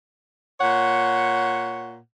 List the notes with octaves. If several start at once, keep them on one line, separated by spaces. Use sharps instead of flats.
A#2 C#5 F#5